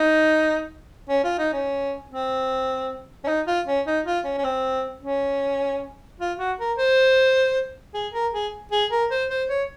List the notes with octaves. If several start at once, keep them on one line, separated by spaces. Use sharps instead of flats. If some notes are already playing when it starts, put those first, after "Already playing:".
Already playing: D#4
C#4
F4
D#4
C#4
C4
C#4
D#4
F4
C#4
D#4
F4
C#4
C#4
C4
C#4
F4
F#4
A#4
C5
G#4
A#4
G#4
G#4
A#4
C5
C5
C#5